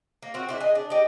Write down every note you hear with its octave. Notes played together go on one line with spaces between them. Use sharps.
A#3
C4 F4 F#4
D4 E4 G4
G#4 D#5
D4
G4 D#5